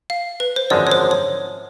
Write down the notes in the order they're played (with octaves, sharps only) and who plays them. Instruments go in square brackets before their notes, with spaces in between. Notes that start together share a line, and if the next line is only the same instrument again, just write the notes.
[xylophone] F5
B4
C5
[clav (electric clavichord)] G#1 F#2 D3 F3 G#3 [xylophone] D5
[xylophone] C#5
C5
C#5